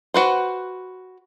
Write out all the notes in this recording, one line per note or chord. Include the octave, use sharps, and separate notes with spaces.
F#4 B4 C5